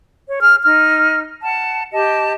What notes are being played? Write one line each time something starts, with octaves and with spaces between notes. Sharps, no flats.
C#5
G#4 F6
D#4 F6
F#5 A5
G4 D#5 A5